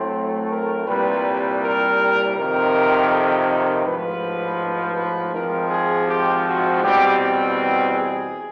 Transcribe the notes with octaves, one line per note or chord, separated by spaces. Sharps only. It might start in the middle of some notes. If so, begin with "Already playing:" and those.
Already playing: A2 F#3 A3 C4 C5
A#4
C2 A#2 G3 C4 B4
A#4
F2 C3 D#3 A#4
A4
A#4
A1 G#2 F3 B4
B4
G#1 G#2 F3 G#3 C4 A#4
G#4
G4
F#4
E2 B2 G3 C4 G4
G#4